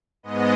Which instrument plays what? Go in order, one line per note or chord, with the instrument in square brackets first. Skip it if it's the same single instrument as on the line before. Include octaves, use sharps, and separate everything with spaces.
[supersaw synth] G#2 G#3 B3 D#5